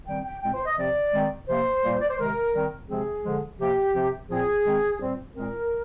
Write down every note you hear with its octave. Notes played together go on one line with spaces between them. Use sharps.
D#3 G3 C4 G5
G5
A#2 G#3 C4 G5
C5
D#5
C3 F3 C4 D5
D#3 G#3 C4
C3 F3 A#3 C5
A#2 G3 A#3
D5
C5
C3 D#3 G#3 A#4
D#3 G3 C4
C3 F3 G#3 C4 G#4
D3 F3 G#3
C3 F3 A#3 G4
C3 F3 C4
A#2 F3 C4 G#4
D#3 G#3 C4
A#2 G3 C4
A#2 G#3 C4 A#4